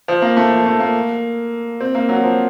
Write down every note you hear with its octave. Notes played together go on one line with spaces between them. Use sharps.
F3
A#3
A3
F3
A3
A#3
C4
A#3
F#3
F3